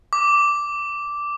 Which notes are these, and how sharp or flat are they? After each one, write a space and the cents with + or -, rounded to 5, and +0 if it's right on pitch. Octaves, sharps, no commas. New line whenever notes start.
D6 -5